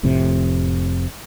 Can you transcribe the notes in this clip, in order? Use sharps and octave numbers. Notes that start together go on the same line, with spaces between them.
F1 F2 A2 C3